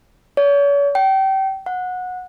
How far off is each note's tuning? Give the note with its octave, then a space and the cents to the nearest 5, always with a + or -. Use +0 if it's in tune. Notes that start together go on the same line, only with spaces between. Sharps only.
C#5 +40
G5 -30
F#5 -20